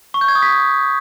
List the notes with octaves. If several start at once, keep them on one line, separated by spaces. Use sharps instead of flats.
C#6
G6
G#6
D#6
B6